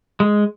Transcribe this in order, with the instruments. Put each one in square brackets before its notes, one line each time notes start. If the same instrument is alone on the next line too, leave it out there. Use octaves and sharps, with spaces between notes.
[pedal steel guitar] G#3